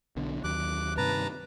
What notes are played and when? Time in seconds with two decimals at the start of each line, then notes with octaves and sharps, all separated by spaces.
0.16 B1 B2 D3
0.44 D#2 F#3 D6 F#6
0.97 G2 C3 D#3 B4 A5 A#5